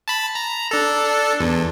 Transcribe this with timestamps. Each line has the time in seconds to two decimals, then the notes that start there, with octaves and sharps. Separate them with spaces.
0.08 A5 B5
0.35 A#5
0.71 D4 A4
1.40 E2